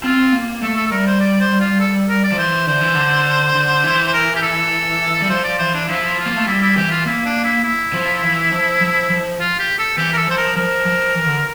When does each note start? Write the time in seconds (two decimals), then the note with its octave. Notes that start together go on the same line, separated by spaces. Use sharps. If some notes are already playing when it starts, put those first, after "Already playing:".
0.04 C4 F4
0.33 A#3
0.62 A3 A4
0.76 A4
0.87 A4
0.91 G3 A#4
1.07 C5
1.20 D5
1.40 C5
1.60 F4
1.80 A4
2.09 A#4
2.24 D5
2.32 F3
2.37 E3 C5
2.67 D3 C5
2.81 E3
2.95 D3
3.55 D3
3.84 E3
4.07 C5
4.13 A#4
4.36 G4
4.42 A4
5.22 G3
5.30 F3 C5
5.44 D5
5.59 E3 C5
5.74 D4
5.88 F3 E4
6.18 F4
6.26 A#3
6.36 A3
6.47 G3 E4
6.62 E4
6.76 E3 G4
6.91 F4
7.05 A#3 E4
7.25 D4
7.44 E4
7.64 E4
7.93 F3
8.22 E3
8.52 F3
8.81 F3
9.10 F3
9.40 F4
9.59 G4
9.78 A4
9.97 E3 G4
10.13 A#4
10.17 A4
10.27 F3 C5
10.37 A#4
10.56 F3 A#4
10.86 F3
11.14 E3
11.26 D3